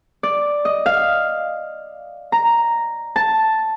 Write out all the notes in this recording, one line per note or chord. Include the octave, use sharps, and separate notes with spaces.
D5
D#5
F5
A#5
A5